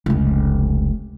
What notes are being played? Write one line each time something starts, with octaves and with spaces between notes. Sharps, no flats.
F1 C#2